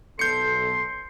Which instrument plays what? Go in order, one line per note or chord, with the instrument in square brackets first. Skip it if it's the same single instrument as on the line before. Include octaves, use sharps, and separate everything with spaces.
[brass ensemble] B1 A4 [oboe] C6 [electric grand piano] G6 C#7